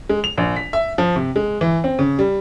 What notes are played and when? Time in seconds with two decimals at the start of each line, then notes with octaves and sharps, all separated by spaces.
0.09 G#3
0.24 F7
0.38 A#1
0.56 B6
0.73 E5
0.98 F3
1.16 C3
1.36 G#3
1.61 E3
1.84 C4
1.99 C#3
2.19 G3